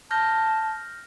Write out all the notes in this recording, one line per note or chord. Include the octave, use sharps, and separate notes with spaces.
A5 F6 G6 A#6